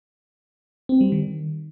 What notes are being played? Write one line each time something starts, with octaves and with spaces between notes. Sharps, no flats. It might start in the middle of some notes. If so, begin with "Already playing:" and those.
C4
G3
D#3